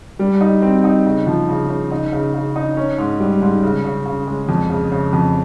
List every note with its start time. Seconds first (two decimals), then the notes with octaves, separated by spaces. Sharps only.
0.19 G3
0.41 D#4
0.62 C4
0.84 D#4
1.06 C#3
1.27 F3
1.48 C#3
1.70 C#3
1.91 D#4
2.12 C#3
2.34 C#3
2.56 D#4
2.77 C#4
2.98 G#2
3.20 G3
3.42 G#2
3.63 C#3
3.84 C#3
4.06 C#3
4.27 G#3
4.49 F2
4.70 C#3
4.92 C#3
5.13 F2